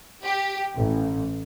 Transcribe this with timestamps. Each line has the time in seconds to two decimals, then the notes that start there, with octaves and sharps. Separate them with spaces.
0.24 G4
0.78 A1